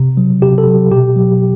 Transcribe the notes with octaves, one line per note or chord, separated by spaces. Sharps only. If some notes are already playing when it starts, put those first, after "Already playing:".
Already playing: C3
F#3
C3 G4
A4
F#3
B2 G4
F#3